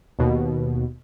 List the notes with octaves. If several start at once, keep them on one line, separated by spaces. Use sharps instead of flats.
D#2 B2